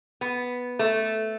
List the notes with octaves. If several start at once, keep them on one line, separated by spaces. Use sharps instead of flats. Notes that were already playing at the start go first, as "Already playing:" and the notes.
B3
A3